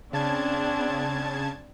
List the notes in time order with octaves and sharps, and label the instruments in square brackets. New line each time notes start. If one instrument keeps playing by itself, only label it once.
[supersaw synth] C#3 A5 G#6 [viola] C4 D4